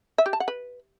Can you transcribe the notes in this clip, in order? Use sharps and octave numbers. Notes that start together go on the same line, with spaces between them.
E5
G4
A5
F#5
B4